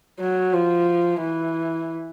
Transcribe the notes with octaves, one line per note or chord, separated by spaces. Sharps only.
F#3
F3
E3